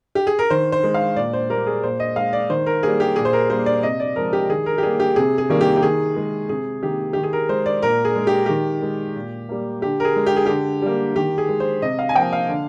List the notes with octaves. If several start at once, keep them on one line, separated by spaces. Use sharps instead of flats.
G4
G#4
A#4
D#3 C5
C5
G#3
F5
A#2 D5
C5
G3 A#3 A#4
G#4
A#2 C5
D#5
G#3 F5
D5
D#3 C5
A#4
G3 A#3 G#4
G4
A#2 G#4
C5
A#4
G3 A#3 C5
D5
C3 D#5
D5
F3 G#3 A#4
G4
D#3 G#4
A#4
G4
G3 A#3 G#4
G4
C3 G#4
G#4
D#3 G3 A#3
G4
G4
D#3 G#4
G#3
C3 G#4
D#3 A#3 G4
D#3 G4
G#4
A#4
G#3 C5
D5
A#2 A#4
G#4
G#3
G4
D#3 G4
G#3
A#2
G3 A#3
D3 G4
A#4
G#4
G#3
G4
G#4
D3 G4
G3 A#3
D#3 G4
G#4
G#3
C5
C3 D#5
F5
G#5
F3 A#3 G5
F5
D3